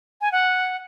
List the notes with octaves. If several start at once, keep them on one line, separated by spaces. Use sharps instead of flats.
G#5
F#5